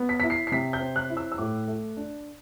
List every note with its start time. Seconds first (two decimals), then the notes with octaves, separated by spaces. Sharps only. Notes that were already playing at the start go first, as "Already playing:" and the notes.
Already playing: B3
0.09 B6
0.20 E4 B6
0.30 C7
0.47 C7
0.52 C3 B6
0.73 G6
0.80 C4
0.96 F#6
1.10 E4
1.17 E6
1.32 E6
1.38 A2 D6
1.68 A3
1.97 D4